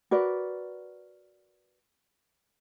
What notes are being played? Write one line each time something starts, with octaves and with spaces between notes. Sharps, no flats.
F#4 A#4 B4 D5